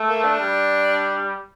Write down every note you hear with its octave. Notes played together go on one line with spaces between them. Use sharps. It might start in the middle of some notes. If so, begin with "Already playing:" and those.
Already playing: A3
A#3
D4
G3